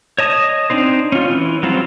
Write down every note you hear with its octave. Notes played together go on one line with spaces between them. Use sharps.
C#5 D#5 A5 D#6
C4 D4 D#4 C5
C#4 F4
E3
F#3 G3 C4 C#4 F4